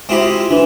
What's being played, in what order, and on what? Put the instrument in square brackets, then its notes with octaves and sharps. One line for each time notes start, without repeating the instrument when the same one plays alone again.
[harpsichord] G#3 C4 E4 G4 [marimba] F#4
[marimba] F4
[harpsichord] E3 [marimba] D4